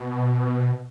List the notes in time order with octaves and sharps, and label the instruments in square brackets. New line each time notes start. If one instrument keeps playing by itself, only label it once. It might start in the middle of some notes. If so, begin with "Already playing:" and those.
Already playing: [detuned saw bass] B2